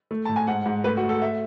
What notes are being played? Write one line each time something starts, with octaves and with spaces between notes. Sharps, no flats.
A3
A2 A5
G#5
G#2 F#5
G#2
A3 B4
F#4
A3
A4
E5